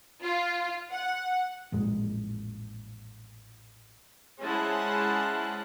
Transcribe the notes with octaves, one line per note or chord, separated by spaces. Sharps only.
F4
F#5
A1 F2 A#2 G#3
G#3 C#4 E4 C5 F#5 A5